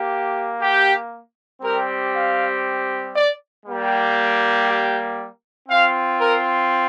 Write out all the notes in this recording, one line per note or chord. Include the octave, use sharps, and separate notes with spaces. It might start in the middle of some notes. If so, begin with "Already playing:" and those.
Already playing: A#3 G4
G4
G3 C4 G4 A#4
F5
D5
G3 A#3 G4
G4
C4 F4 F5
A#4